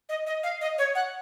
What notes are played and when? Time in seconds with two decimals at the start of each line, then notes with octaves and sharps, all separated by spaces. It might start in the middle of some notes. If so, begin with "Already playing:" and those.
0.09 D#5
0.26 D#5
0.43 F5
0.61 D#5
0.78 C#5
0.95 F#5